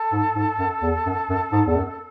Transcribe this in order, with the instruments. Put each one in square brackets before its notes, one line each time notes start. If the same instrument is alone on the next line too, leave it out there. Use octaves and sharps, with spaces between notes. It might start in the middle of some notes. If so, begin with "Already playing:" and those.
Already playing: [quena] A4
[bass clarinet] G#2
G#2
F#2
E2
F#2
F#2
G#2
E2
F#2